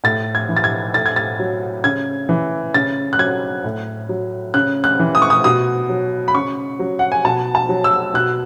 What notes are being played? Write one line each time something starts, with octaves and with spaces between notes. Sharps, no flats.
A2 A6
G#6
E3
A6
G#6
A2 A6
G#6
A6
F#3
C#3 G#6
E3
C#3 A6
F#6
F#3 G#6
A2
F#3
C#3 F#6
F#6
E3
D#6
C#6
D#6
B2 D#6
F#3
B5
C#3 C#6
F#3
F#5
G#5
B2 A5
A5
F#3
E6
B2 F#6